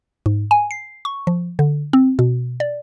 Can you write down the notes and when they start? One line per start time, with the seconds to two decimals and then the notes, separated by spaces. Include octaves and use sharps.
0.26 G#2
0.51 G#5
0.71 C7
1.05 C#6
1.27 F3
1.59 D3
1.93 C4
2.19 B2
2.60 D5